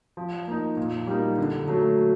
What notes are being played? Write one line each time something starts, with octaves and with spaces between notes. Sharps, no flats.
F3
A#3 D#4
A#2
G3 A#3 D#4
D3
F#3 A3